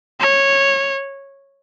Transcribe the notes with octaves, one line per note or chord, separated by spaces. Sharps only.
C#5